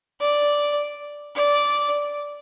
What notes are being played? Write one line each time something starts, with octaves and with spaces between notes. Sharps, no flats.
D5
D5